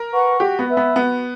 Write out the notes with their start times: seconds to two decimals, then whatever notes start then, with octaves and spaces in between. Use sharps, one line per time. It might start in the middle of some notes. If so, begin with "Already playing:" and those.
Already playing: A#4
0.12 B4 F#5 C#6
0.40 F#4 G4
0.59 B3
0.68 B4 E5 B5
0.77 B3
0.96 B3 F#4